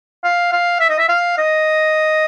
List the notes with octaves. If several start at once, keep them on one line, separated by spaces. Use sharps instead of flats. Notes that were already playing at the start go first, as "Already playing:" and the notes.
F5
F5
E5
D#5
E5
F5
D#5